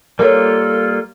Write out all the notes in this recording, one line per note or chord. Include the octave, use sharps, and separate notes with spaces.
G3 A#3 F4 A4 A#4 C#5